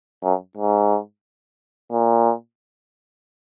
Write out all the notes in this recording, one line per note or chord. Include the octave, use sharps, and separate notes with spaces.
F#2
G#2
A#2